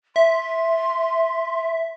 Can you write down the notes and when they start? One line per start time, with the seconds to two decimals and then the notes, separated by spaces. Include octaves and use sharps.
0.16 E5 C6